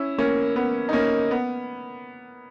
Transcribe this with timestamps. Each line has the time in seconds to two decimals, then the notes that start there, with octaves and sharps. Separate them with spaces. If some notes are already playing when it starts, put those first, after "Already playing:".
Already playing: C#4 E4
0.18 A#3 C#4
0.56 B3
0.89 D#4
0.93 A#3 C#4
1.31 B3